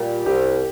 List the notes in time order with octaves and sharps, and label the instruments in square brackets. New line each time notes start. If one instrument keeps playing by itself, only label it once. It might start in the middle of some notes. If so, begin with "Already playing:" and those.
Already playing: [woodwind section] A#2 G3 [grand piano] G4
[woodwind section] C2 [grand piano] G4